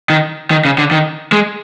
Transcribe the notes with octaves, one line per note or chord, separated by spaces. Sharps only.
D#3
D#3
C#3
D3
D#3
G#3